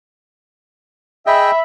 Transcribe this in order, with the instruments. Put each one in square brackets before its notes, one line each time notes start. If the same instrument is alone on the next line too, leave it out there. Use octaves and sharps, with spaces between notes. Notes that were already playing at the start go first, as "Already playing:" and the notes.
[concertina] G#4 D#5 G5 [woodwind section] E5 B5